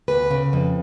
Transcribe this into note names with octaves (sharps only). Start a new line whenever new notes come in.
D2 B4
C#3
F2